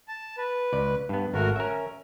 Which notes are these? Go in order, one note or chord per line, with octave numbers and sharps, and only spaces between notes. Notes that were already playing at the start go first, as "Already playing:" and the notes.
A5
B4
C#2 D5
G2 B3
G#1 A3 F#4 A#4
C#4 A#4 E5